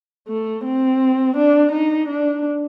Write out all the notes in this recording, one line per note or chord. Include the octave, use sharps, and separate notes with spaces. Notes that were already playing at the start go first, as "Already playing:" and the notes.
A3
C4
D4
D#4
D4